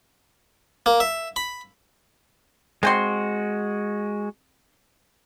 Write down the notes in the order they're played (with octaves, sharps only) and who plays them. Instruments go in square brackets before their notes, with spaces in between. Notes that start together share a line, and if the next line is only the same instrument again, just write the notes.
[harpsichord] A#3
E5
B5
[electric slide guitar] G#3 F#4 [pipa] C4 G5 C6